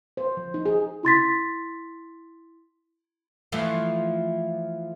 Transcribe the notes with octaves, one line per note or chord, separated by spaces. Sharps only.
C5
F3
D#4
G#4
E4 C6 A6 B6
E3 F3 A3